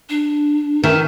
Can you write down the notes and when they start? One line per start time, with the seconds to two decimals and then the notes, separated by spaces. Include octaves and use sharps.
0.09 D4
0.84 D#3 C#4 A#4 E5